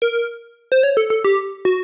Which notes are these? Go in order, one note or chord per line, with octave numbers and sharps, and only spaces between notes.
A#4
C5
C#5
A4
A4
G4
F#4